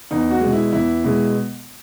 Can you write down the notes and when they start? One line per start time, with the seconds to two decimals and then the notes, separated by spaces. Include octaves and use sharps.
0.11 E2 D#4
0.31 F#4
0.41 B2 G#3
0.53 E4
0.72 E2 E4
1.04 B2 G#3